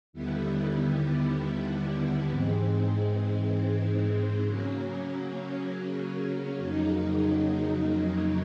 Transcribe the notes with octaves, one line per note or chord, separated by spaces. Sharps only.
D#2 D3 G3 B3 E4
G#2 E3 G#3 C4
C#3 F#3 A#3 C#4
F2 C#3 F#3 A#3 D#4